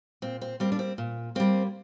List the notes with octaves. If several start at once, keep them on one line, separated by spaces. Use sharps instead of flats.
A#2 C4
C4
G3 A#3 C4
D4
C4
A#2
G3 A#3 C4